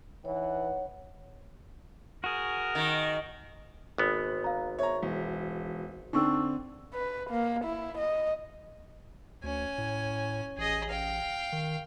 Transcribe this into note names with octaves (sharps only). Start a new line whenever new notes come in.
E3 D#4 B4 C#5 F#5
F#4 G#4 A#4
D#3
G#1 B3
F5 A#5
C#5 E5 A#5
E1
D3 C4 D4 D#4 C#6 E6
B4
A#3
E4
D#5
D2 C#4 G#5
A2
A1 G#4 D#5
F5 G5
D#3